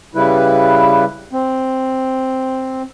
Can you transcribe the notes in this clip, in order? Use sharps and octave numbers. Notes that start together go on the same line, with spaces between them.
C#3 G3 E4 B4
C4